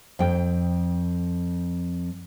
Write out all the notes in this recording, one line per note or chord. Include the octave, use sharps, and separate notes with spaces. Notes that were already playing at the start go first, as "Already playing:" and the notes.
F2 G5